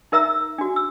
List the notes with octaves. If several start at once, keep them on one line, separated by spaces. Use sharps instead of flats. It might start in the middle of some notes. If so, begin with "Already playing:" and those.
D#4 A#4 E5 A#5 E6
D4 F#4
E6